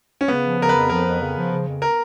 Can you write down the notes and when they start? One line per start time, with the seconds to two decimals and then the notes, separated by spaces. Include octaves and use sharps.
0.21 C#4
0.28 C#3 B3
0.43 F3
0.59 C#3 A#4
0.69 B4
0.75 F2
0.90 F3 A#4
1.06 F2
1.21 C#3
1.37 F3
1.52 C#3
1.67 F2
1.82 A#4